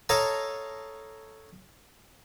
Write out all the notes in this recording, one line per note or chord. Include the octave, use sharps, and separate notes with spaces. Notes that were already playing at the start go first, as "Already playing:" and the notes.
A4 C#5 D#5 F5 A5 A#5